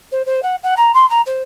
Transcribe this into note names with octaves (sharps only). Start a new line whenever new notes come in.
C5
C5
F#5
F#5
A#5
C6
A#5
C5